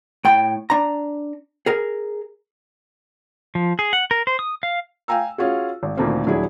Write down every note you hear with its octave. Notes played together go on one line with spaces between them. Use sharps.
A2 G5
D4 A#5
G#4 A#4
F3
G#4
F#5
A#4
C5
D#6
F5
F5 G5 G#5 A#5 E6
C#4 F4 F#4 G#4
G#1
D2 A#2 D#3 A3 A#3 C4
D#1 F#3 D4 E4 G#4